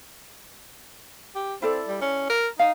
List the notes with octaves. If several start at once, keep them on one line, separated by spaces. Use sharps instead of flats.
G4
C4 E4 A4 D5
G3
C#4
A#4
D#4 F5